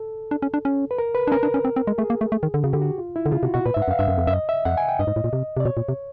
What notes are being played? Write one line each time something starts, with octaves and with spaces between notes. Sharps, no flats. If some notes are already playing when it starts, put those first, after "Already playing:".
Already playing: A4
D4
C#4
D4
C#4
B4
A#4
B4
D4
C#4 A#4
D4
C#4
C4
C4
G#3
A3 G#4
A#3
A3
A3
D#3
D3
C#3 F#4
D3 G4
F#4
F4
E4
D3
C#3 F4
C3 F#4
B2 F#4
A#2 B4
G#2 E5
F#5
F#2
F5
G2 E5
F#2
F2
F#2 E5
D#5
E5
F2 F#5
G#5
G5
G2 D#5
G#2
A2
A#2
C3
C3 D5
B2 C#5
A#2
C3